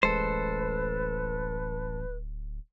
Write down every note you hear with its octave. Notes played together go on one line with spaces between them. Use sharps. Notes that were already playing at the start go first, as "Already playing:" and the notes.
D1 A1 G#3 A4 B4 C5